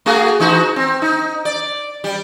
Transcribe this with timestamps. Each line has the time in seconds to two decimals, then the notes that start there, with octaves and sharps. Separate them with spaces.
0.06 A3 F#4 G#4
0.40 E3 D#4 F#4
0.76 C4
1.02 D#4
1.45 D5
2.04 G3